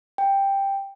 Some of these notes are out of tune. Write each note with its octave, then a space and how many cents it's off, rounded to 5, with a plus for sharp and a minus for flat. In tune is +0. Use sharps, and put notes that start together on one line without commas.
G5 +10